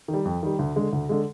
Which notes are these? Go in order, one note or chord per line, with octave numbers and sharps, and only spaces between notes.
D#3
G3
F2
D#3 G3
D2
D3 G#3
D2
D3 G#3